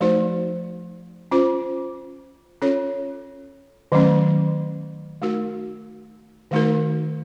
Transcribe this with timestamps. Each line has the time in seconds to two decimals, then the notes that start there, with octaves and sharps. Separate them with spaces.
0.01 F3 A3 D#4 F#4 C5
1.31 C#4 F4 C5
2.62 C#4 F4 A4 C#5
3.92 D#3 F#3 A3 C#4
5.22 A3 D#4 F#4 A#4
6.51 D#3 A3 D#4 F#4 A#4